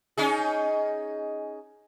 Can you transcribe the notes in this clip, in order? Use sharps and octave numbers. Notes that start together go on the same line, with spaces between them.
C#4 D#4 G#4